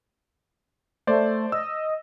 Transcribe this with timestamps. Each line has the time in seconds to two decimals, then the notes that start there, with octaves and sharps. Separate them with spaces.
1.07 A3 C5 D5
1.52 D#5 E6